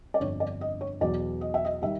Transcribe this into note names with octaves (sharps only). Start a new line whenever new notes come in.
D5
G1 F2 D3 C#5
D5
D#5
C#5
E2 B2 F#3 D5
D#5
E5
D#5
D#3 G3 E5